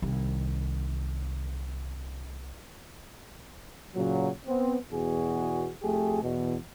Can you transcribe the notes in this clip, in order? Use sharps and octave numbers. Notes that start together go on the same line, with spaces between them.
C2 D#3
A#2 C#3 F#3
B3 C4
E2 B2 F#4 G#4
F2 A3 G4 G#4
E2 B2